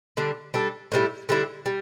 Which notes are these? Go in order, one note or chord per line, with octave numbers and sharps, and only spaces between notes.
D3 G3 D4
G3 D4 A4
A2 E3 G3 E4
D3 G3 E4
G3